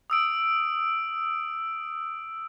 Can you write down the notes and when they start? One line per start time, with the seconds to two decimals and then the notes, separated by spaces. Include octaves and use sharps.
0.10 D#6 E6 D7